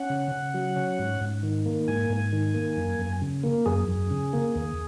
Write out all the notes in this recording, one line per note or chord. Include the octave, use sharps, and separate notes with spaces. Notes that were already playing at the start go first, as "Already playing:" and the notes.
Already playing: C#4 F#5
C#3
C#3
F#3
C#4
G#2
G#2
D#3
A#3
G#2 G#5
G#2
D#3
A#3
F#2
F#2
C#3
A#3
F#2 G#4
F#2
C#3
A#3
D#2